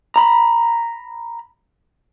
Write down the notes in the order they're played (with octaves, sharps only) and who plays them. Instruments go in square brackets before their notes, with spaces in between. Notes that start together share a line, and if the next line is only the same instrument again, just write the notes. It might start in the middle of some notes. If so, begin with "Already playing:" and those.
[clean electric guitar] A#5 B5